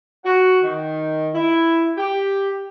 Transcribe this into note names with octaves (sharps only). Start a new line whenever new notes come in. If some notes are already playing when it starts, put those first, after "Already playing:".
F#4
D#3
E4
G4